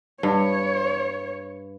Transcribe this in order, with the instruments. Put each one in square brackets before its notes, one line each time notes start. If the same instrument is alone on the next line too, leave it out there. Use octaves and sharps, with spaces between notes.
[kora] G2 [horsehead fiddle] C#5